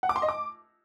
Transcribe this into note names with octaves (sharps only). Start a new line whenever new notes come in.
F#5
D6
C6
D#5
D6